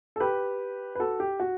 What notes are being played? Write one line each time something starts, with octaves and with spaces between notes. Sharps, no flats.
A4
G4 B4
B4
F#4 A4
G4
F#4